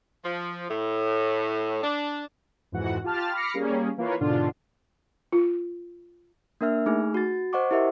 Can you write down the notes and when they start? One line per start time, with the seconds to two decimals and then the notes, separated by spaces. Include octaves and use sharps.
0.24 F3
0.70 A2
1.83 D4
2.72 F2 G#2 E3 F#4 F#5
3.04 F4 G4 A5 F6 A6
3.33 B5 D6 F6 A#6 C7 C#7
3.54 G3 A#3 C#4 G#4
3.97 E3 A#3 F4 B4 C#5
4.21 G#2 B2 D3 D4 F4
5.32 F4
6.61 A#3 D4 A#4 E5 F6
6.86 A3 D#4 G#4 G#5 F6
7.14 F#4 A6
7.53 C5 D#5 F#5 C#6 D6
7.71 E4 G4 A#4 E5 F#5